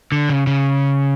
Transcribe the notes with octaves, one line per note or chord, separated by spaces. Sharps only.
D3
C#3
C#3